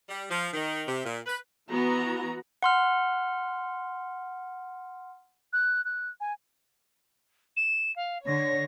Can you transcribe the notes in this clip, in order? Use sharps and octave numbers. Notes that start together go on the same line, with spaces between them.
G3
F3
D#3
C3
A#2
B4
E3 B3 F#4 A#5
F#5 C6 F6
F#6
F#6
G#5
E7
F5
D3 C#5 A#6